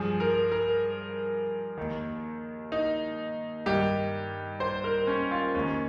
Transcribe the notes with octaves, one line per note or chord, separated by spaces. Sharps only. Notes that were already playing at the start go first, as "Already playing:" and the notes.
Already playing: G2 F3 G#4
A#4
A#4
D#2 D#3
D#4
G2 D#3 G4
C5
A#4
C#4
F4
D#2 D#3 C#4